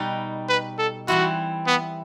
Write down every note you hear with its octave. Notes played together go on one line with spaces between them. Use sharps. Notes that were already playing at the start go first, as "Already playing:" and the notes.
Already playing: B2 G3 D#4
B4
A4
E3 G3 C4 E4 F#4
B3